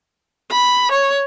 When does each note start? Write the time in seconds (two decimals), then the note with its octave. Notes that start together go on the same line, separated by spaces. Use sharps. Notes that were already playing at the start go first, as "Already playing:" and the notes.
0.52 B5
0.92 C#5